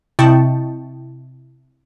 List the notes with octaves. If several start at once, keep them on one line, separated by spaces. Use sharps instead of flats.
C3 E4 D#5 G5 A5 C#6